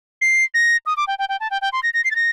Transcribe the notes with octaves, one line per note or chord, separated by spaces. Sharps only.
C7
A#6
D#6
D6
G5
G5
G5
A5
G5
G5
C6
A#6
A#6
C7
A6
A#6